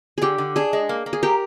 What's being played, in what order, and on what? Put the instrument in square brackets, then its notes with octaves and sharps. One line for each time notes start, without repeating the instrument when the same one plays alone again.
[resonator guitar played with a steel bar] D3 [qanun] G4 G#4
[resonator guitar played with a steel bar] D3
[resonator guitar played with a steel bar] D4 [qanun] G#4
[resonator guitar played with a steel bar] G#3
A#3
A#3
[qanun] G#4
[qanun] G4 [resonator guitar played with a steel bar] A#4